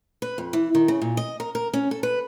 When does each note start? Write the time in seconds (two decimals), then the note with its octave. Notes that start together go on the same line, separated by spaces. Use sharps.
0.22 B4
0.38 F2
0.53 E3
0.75 D#3
0.88 C#3
1.02 A#2
1.17 D#5
1.40 A#4
1.55 A#4
1.74 C#4
1.91 A4
2.03 B4